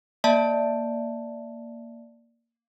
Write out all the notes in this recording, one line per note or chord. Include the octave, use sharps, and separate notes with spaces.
A#3 D5 E5 A5